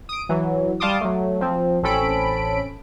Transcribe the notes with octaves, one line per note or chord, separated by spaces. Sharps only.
D#6 D7
E3 F#3
G3 F5 A5 C6 D6 D#6
F#3 A3
F3 C4
A1 C4 C#4 A4 B5 D7